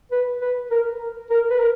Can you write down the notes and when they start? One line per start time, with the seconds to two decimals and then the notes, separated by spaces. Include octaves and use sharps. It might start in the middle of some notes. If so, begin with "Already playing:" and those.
0.12 B4
0.41 B4
0.71 A#4
1.30 A#4
1.50 B4
1.60 A#4